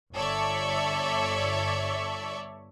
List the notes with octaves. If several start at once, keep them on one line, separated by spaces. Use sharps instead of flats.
G1 A4 C#5 D5 E5 C#6